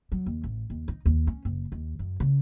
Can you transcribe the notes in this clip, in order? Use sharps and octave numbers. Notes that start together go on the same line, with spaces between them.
F#3
D#2
A1
D#2
D#4
D#2
C#4
F#1
D#2
F#2
C#3